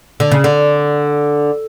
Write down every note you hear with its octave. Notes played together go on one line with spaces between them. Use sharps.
D3
C#3
D3